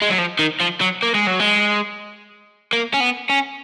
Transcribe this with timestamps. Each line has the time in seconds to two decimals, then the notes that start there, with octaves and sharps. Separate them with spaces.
0.02 G#3
0.10 F#3
0.18 F3
0.39 D#3
0.61 F3
0.81 F#3
1.03 A#3
1.14 G#3
1.27 F#3
1.39 G#3
2.73 A#3
2.94 C#4
3.00 B3
3.29 C#4